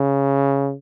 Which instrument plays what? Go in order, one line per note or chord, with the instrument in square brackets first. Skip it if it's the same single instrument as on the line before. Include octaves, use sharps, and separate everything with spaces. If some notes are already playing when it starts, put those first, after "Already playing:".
Already playing: [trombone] C#3